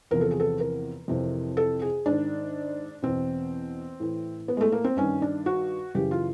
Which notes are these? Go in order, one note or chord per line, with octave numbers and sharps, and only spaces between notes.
E2 C3 F3 A#4
A4
G#4
A4
A#4
F2 C3 E3
A4
G#4
G#2 D#3 D4
E2 B2 C4
A2 E3
B3
G#3
A3
A#3
C4
G2 D#3 C#4
D4
F#4
F#2 C#3 E3 G4
F4